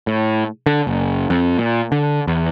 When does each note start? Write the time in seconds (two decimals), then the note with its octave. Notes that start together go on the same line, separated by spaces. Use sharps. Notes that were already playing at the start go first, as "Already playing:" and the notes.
0.07 A2
0.66 D3
0.87 F#1
1.30 F2
1.58 A#2
1.92 D3
2.27 E2